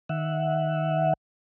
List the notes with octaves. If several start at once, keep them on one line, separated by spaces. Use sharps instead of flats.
D#3 E5 F#5